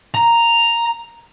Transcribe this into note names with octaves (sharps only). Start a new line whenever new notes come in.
A#5